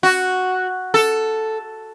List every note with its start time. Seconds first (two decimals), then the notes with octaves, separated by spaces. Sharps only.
0.03 F#4
0.94 A4